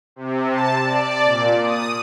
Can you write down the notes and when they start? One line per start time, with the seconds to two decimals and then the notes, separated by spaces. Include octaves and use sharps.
0.16 C3
0.51 A5
0.84 D5
1.24 A#2
1.62 D#6